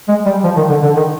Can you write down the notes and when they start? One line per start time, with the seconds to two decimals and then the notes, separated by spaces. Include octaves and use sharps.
0.08 G#3
0.26 G3
0.44 F3
0.56 D#3
0.70 D3
0.83 D3
0.96 D#3